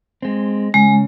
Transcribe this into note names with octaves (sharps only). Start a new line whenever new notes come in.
G#3 C4
C#3 G#3